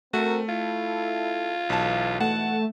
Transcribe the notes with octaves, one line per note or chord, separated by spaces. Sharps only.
A3 C4 F#4 A#4
E4 F4 A4
B1 G#2 B2 E3 A5
A3 F#5 A5